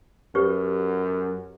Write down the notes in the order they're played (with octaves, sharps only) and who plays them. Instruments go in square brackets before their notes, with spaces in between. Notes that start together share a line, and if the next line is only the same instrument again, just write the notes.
[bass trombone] F#2 [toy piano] G4 B4 C#5